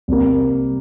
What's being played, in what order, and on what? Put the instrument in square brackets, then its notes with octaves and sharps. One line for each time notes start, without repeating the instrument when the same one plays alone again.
[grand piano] C2 C3 G3 A#3